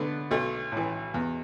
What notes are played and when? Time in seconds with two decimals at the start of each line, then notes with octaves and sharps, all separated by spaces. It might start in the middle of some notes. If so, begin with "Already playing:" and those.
Already playing: D3 A3 B3
0.31 B1 A3
0.72 A2 E3
1.14 E2